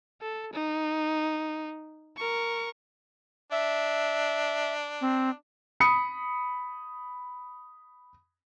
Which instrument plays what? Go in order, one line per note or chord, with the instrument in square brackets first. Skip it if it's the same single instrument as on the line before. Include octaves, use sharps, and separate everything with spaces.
[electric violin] A4
D#4
A#4 C#6
[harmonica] D4 [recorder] E5
[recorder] C4
[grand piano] B5 D#6 C#7